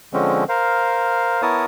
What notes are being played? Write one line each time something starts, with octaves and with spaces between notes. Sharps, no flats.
D3 F3 G#3 C4 C#4
A#4 C5 F5
B3 E4 A#4 C#5 A5 D#6